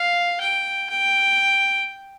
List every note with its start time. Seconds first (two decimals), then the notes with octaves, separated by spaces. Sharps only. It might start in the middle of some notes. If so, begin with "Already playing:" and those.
Already playing: F5
0.41 G5
0.90 G5